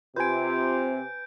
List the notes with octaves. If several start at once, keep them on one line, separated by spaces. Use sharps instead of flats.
C3 F4 B4 G#5 G6 D7